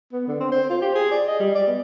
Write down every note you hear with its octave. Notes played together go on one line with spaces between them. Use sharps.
B3
D3
C4
C5
F4
G4
G#4
D5
D#5
G3
D5
B3